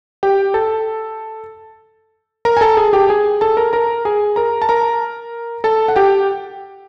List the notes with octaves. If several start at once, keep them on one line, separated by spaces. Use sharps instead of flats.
G4 G5
A4 A5
A#4 A#5
G#5
A4 A5
G#4 G#5
G4 G5
G#4 G#5
A4 A5
A#4 A#5
A#4 A#5
G#4 G#5
A#4 A#5
A5
A#4 A#5
A4 A5
F#5
G4 G5